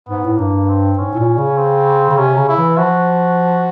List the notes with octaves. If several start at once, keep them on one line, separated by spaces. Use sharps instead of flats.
G#2 B3
A2
G2 A#3
C4
G#2 C#4
A2
A#2
C#3
C4
C#3
C3 C#4
C#3
E4
E3
F3 F#4